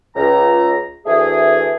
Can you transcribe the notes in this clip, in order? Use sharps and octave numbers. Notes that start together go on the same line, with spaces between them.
C#2 A#5
D2 E3 A3 G#4